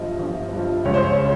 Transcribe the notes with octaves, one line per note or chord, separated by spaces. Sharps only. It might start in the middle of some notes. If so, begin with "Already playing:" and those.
Already playing: G1 G2 F3 D#5
G1
G2 F3
C#2 C#5
C5
C#5
C#3